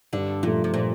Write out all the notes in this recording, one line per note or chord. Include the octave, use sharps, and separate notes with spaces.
G2 D3
A#2 F3 A3
C3
A#2